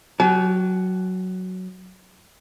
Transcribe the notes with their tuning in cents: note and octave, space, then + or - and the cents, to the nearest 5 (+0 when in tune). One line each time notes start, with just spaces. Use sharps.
F#3 +0 G4 -30 A5 -45